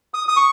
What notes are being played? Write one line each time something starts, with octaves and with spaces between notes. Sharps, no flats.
D#6
D#6
C#6